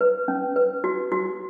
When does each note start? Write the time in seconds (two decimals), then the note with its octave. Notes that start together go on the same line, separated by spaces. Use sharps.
0.01 B4
0.28 C#4
0.56 B4
0.84 F#4
1.12 F#4